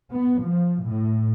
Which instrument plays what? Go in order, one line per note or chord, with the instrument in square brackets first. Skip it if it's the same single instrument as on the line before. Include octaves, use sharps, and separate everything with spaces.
[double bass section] B3
F3
A2